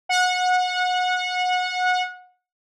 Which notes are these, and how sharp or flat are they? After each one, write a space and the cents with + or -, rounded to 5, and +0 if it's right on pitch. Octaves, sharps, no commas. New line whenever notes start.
F#5 -25